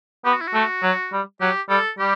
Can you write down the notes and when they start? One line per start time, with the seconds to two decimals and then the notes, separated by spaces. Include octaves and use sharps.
0.25 B3 G4
0.33 F#4
0.41 E4
0.47 F#4
0.54 A3
0.83 F#3
1.13 G3
1.41 F#3 G4
1.69 G3 A4
1.99 G3 G4